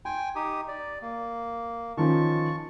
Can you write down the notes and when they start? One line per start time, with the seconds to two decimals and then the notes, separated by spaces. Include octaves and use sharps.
0.05 G5 G#5 C6
0.36 D#4 G4 D#6
0.68 D5
1.02 A#3
1.97 D#3 F3 C#4 A5 C#6